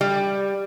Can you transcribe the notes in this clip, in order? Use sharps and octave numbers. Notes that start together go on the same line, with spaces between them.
G3